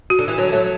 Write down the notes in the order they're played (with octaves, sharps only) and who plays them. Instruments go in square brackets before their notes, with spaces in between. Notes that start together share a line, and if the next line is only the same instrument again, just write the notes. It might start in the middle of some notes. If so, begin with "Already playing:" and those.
[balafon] F#4
[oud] D3
E3
D3 F#3
F#3 A3